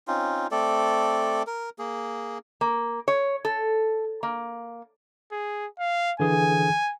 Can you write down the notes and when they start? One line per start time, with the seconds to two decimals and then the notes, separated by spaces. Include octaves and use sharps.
0.08 C4 C#4 D#4 F4
0.51 A3 C4 A4 D5
1.47 A#4
1.79 A#3 G#4
2.61 A#3
3.08 C#5
3.45 A4
4.23 A#3
5.32 G#4
5.79 F5
6.20 D3 E3 G#4 G#5